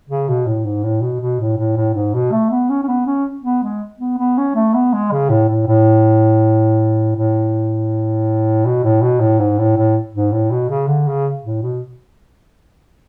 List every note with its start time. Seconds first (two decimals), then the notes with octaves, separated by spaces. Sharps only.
0.10 C#3
0.29 B2
0.47 A2
0.65 G#2
0.83 A2
1.02 B2
1.21 B2
1.40 A2
1.58 A2
1.77 A2
1.95 G#2
2.14 B2
2.32 A3
2.51 B3
2.70 C#4
2.83 C#4
2.88 B3
3.06 C#4
3.44 B3
3.63 G#3
3.99 B3
4.18 B3
4.38 C#4
4.56 A3
4.74 B3
4.94 G#3
5.12 C#3
5.30 A2
5.49 A2
5.67 A2
7.16 A2
8.66 B2
8.84 A2
9.02 B2
9.20 A2
9.39 G#2
9.58 A2
9.77 A2
10.14 G#2
10.32 A2
10.51 B2
10.69 C#3
10.88 D3
11.07 C#3
11.44 A2
11.62 B2